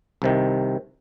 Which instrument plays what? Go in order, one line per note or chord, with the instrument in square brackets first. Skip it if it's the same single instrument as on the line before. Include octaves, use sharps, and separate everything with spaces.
[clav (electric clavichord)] C2 C3 D#3